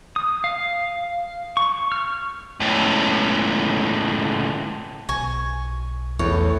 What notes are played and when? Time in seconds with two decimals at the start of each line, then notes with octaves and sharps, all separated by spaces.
0.16 D#6
0.44 F5
1.57 C#6
1.92 F6
2.60 C#2 A2
5.09 B1 G#5 C#6
6.19 E2 A2 C#5